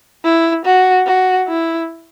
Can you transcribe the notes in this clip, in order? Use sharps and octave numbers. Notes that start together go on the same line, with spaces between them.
E4
F#4
F#4
E4